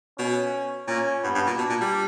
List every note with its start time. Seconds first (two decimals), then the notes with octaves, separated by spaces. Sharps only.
0.18 B2 C#4
0.88 A#2 C#4
1.24 G2 B3
1.35 G2
1.47 A#2
1.57 B2 D4
1.70 A#2
1.81 G3